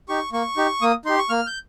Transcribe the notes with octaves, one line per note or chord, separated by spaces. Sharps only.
D#4 G4 C#6
A#3 C#6
D#4 G4
A#3 D#6
D#4 G4 C6
C#6
A#3 F6
G6